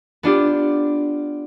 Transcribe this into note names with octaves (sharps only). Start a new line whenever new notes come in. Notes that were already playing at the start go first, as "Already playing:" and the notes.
B3 D4 F4 G4